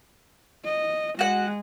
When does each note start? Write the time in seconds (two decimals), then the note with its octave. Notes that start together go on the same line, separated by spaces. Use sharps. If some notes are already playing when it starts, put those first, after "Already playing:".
0.65 D#5
1.19 G#3 F#4 F#5